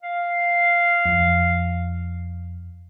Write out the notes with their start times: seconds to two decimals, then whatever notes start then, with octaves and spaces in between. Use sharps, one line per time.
0.02 F5
1.05 F2